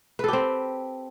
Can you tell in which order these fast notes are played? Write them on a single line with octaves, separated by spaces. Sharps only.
B4 A4 G4 C4